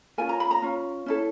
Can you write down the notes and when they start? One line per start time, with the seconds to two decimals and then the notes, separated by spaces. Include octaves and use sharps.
0.18 C#4 F4 A#4 G#5
0.29 A#5
0.40 B5
0.51 A#5
0.62 C#4 F4
1.06 C#4 E4 A4